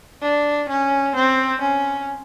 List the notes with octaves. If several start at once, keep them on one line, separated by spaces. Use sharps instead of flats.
D4
C#4
C4
C#4